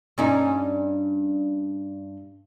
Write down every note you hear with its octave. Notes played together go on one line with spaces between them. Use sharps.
G2 C#4 D#4